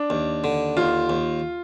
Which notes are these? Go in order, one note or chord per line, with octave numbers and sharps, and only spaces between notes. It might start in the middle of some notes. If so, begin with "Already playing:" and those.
Already playing: D4
D#2
D3
D#2 F4
D#2